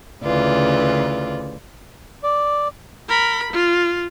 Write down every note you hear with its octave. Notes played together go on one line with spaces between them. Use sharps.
D2 C#3 E3 F4 D5
D5
A#4 B5
F4